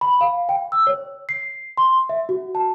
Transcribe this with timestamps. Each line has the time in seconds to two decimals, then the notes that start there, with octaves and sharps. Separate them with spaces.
0.01 B5
0.21 F5
0.49 G5
0.72 E6
0.87 C#5
1.29 C7
1.78 C6
2.09 E5
2.29 F#4
2.55 A5